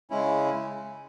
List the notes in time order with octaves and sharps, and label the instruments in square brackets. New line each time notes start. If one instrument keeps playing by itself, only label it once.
[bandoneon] C#3 G#3 C#4 E4